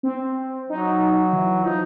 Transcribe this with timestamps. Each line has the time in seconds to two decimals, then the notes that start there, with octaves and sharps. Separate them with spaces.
0.03 C4
0.70 F#3 D#4
1.33 E3
1.64 F3 D#4